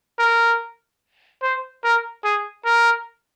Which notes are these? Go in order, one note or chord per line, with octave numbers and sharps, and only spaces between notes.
A#4
C5
A#4
G#4
A#4